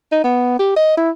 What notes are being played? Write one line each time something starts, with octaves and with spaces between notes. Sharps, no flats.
D#4
B3
G4
D#5
E4